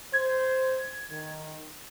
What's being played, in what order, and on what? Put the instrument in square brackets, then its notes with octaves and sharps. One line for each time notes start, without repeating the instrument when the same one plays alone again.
[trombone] C5 [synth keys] G#6
[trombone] D#3